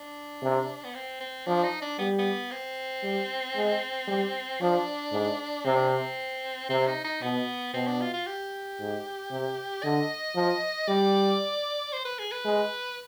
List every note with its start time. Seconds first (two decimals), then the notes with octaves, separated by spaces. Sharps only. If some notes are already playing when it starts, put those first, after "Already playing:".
Already playing: D4
0.42 C3
0.84 B3
0.95 C4
1.21 C4
1.47 F3 D4
1.64 D#4
1.82 D4
1.99 G3 B3
2.19 B3
2.51 C4
3.03 G3
3.56 G#3
4.08 G3
4.61 F3 D4
5.12 G#2
5.65 C3 C4
5.76 D4
5.88 C4
6.70 C3 C4
6.87 D#4
7.04 D#4
7.22 B2 B3
7.74 B2 C4
7.87 D4
8.01 F4
8.13 F4
8.27 G4
8.79 G#2
9.31 C3
9.83 D3 D#5
10.35 F3
10.88 G3 D5
11.93 C5
12.05 B4
12.19 G#4
12.32 B4
12.45 G#3